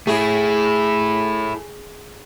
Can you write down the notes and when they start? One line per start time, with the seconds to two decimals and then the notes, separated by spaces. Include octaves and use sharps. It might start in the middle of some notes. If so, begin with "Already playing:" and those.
0.07 A3 E4 G#4